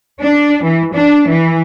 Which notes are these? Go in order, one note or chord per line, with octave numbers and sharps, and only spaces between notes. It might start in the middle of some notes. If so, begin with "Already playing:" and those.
D4
E3
D4
E3